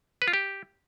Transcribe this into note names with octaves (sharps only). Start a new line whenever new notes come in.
B4
F4
G4